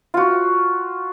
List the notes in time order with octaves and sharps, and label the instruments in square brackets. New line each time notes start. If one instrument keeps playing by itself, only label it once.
[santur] F4 F#4